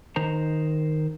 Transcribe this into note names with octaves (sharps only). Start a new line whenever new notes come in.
D#3 D#4 C5 A#5